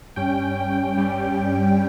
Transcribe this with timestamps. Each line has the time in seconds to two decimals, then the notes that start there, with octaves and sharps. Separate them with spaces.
0.16 G2 G3 C#4 G5
0.97 G2 G3 C#4